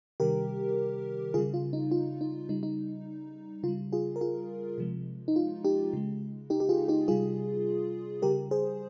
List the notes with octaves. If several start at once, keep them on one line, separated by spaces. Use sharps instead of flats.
C3 D#3 G3 G4 A#4
C#3 G3 F4 G#4
F4
D#4
F4
D#4
C#3 G3 D#4
D#4
C#3 F4
G3
F4 G#4
A#4
F4 G#4
C3 F3 G#3
D#4
F4
D#4 G4
C#3 G#3
D#4 G4
G4
F4 G#4
D#4 G4
C3 G3 F4 G#4
C#3 G3 G4 A#4
G#4 C5